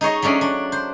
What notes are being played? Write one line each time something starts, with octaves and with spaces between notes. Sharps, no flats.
D#4 G#4 C#5 D#5
F#3 A3 C#4 D4
D4
C5